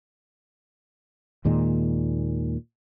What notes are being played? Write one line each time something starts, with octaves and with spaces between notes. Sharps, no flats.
D#2 A#2 D#3 G#3